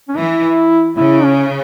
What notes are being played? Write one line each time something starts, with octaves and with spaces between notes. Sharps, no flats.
C#4
E3 E4
C#3 E4
C#4